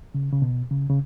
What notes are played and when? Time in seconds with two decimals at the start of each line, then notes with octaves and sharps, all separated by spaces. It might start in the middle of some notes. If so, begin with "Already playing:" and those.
0.15 C#3
0.33 C#3
0.42 B2
0.71 C#3
0.89 C#3